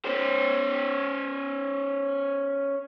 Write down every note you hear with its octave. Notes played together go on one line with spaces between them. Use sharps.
C#4 C5